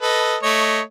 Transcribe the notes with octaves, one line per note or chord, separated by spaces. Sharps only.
A4 B4 D#5
A3 C#5 D#5